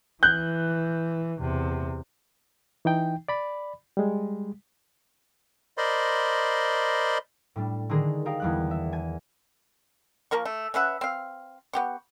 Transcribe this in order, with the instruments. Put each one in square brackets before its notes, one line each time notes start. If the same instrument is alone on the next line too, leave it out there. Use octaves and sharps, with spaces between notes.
[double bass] E3 [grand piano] F#6 G6
[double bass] E2 C3
[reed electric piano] E3 D#4 G5
D5 B5
G3 G#3
[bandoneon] A#4 C5 D5 D#5 B5 C6
[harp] A2 G3 D4
D3 D#3 G#3 D4 G#4 A#4
G4 A#4 D#5 F5
E2 G3 F#6
E5
G#5 G#6
[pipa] F3 A#3 A#4 C#6
A3
C#4 B4 E5 F#5
C4 F5
B3 G4 C#6